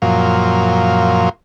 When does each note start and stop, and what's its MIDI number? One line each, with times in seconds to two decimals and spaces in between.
0.02 1.29 42
0.02 1.29 46
0.02 1.29 53